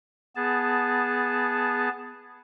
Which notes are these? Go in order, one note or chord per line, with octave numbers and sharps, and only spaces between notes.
B3 G#4 A5